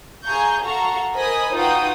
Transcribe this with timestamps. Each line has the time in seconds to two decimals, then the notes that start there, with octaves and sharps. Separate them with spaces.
0.24 G#4 F5 G#5 A#5 C#6 G6
0.62 F#4 A4 F5 A#5 C#6
1.13 A#4 C5 D#5 G#5 B5 D#6
1.54 D#4 F4 F#4 B4 G5 D#6